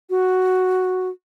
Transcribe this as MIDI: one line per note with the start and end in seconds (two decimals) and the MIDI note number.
0.10 1.09 66